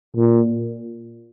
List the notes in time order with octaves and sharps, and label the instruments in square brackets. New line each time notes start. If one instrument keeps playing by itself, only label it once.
[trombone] A#2